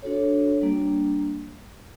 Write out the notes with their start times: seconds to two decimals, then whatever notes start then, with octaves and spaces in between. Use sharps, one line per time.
0.02 D4 F#4 A4 C#5
0.61 G3 A#3 D4